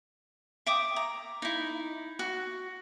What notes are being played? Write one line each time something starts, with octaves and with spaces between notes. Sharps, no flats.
E5 G5 D6 D#6
A#5
D#4 E4
F#4